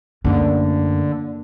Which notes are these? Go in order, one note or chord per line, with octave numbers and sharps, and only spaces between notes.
F#2 D3 A3 A#3 D4